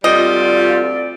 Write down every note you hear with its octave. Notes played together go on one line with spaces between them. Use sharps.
D2 G3 C4 F4 D5 D#5